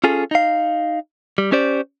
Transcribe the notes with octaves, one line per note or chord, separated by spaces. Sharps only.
C#4 F4 G#4 A4
D#4 F5
G3
C#4 G4 C5 D5